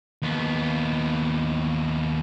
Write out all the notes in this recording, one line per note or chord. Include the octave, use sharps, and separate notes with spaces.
D#2 B3